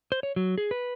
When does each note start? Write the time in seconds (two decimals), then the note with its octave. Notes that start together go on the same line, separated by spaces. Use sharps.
0.12 C5
0.23 C#5
0.36 F#3
0.58 G#4
0.71 B4